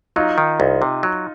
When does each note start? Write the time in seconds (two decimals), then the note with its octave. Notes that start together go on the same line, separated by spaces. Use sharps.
0.16 F#3 D#4 F4
0.38 D#3
0.60 C2
0.82 C3
1.03 F#3